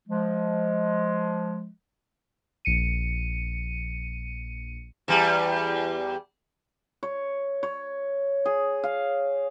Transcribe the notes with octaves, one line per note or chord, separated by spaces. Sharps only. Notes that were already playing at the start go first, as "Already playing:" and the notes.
F3 G#3
A#1 C#7 D#7
E2 G3
C#5
C#5
G#4
F5